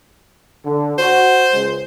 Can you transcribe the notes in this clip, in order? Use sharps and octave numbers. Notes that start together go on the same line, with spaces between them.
D3
F#4 C5
C#2 G#3